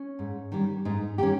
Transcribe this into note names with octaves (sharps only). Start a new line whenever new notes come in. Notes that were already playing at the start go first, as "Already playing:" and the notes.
Already playing: C#4
G#2
D#3 G3 C#4
G#2 D#4
D#3 G3 C#4 G4